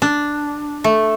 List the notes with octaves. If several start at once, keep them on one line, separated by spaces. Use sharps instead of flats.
D4
A3